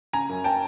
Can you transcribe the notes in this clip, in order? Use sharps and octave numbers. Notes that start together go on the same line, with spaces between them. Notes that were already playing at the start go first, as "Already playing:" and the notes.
C#3 G#5 A#5
F#2
G5 A5